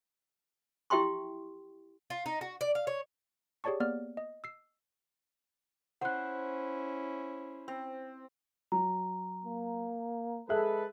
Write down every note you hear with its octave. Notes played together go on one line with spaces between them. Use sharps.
E4 G4 E5 G5 C6 C#6
F4
D#4
F#4
D5
F5
C#5
G4 G#4 C#5 D5 A5 C#6
A#3 B3 D5 F6
D#5
E6 C7
C#4 E4 C5 F#5 F#6
C4
F#3 A#5
A#3
G#3 G#4 A4 B4 E5 F#6